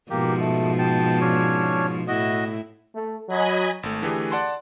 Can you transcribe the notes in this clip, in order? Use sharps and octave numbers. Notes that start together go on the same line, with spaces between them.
G#2 B2 F3 A#3 G4
A3
G5 A5
C#4 D4 C#5
A2 E4 F#4 D#5
A3
F#3 D#5 G#5 B5
G#1 A3
D3 E3 A3 G4 G#4
D5 F#5 A5 C6